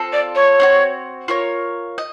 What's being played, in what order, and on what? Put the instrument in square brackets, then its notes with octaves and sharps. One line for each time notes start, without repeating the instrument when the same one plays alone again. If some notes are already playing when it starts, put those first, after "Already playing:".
Already playing: [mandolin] C4 F4 A4
[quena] D5
C#5
[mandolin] C4 D#4 F#4
F4 A#4 C#5
D#5